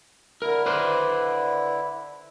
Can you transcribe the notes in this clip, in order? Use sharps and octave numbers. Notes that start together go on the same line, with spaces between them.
D3 E4 A#4
B4 C5 D5